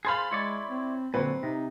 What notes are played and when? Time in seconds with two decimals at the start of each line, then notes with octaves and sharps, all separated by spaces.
0.05 G#4 C5 F5 B5 C6 A6
0.31 G#3 E4 C#5 D5
0.70 C4
1.14 A#2 D3 F#3 C4 B4
1.43 C3 D#4